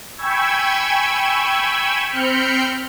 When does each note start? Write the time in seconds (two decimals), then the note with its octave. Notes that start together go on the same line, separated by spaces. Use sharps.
0.17 G5 G#5 B5 C#6 E6 G#6
2.09 C4 B5 F6 G6 C#7